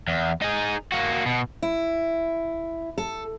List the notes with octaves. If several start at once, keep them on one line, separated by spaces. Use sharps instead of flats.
E2
D#4 G#4
A#3 F#4
B2
E4
A4